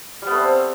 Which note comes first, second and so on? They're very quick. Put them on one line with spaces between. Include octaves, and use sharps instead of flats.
G3 B3 A3 C4